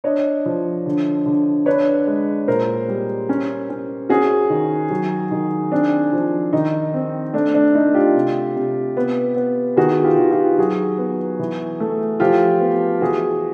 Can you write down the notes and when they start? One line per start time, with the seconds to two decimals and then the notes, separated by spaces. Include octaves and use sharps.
0.04 D4 C#5 D#5
0.46 F3
0.86 D3
1.26 D3
1.66 D4 B4 C#5
2.07 G#3
2.48 A#2 A#4 C5
2.88 G3
3.29 C#4
3.70 C#4
4.09 C#4 F#4 G#4
4.50 D#3
4.90 F#3
5.31 D#3
5.72 C4 D4
6.13 F3
6.53 D#3 D#4
6.94 C4
7.33 A3 D4
7.54 D4
7.75 A3 D#4
7.94 F4 G4
8.15 C3
8.56 C3
8.97 B3
9.36 B3
9.77 D#3 F#4 G#4
10.04 F4 G4
10.18 D#3
10.31 F4 G4
10.58 F#3 F#4 G#4
10.98 B3
11.39 E3
11.80 A3
12.20 F3 F4 G4
12.61 B3
13.01 E3 F#4 G#4